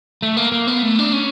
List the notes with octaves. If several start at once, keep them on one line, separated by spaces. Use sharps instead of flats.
A3
A#3
A#3
B3
A3
D4
C#4